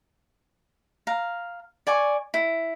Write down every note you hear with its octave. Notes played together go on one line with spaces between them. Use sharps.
F5 A#5
D5 G#5 C#6
E4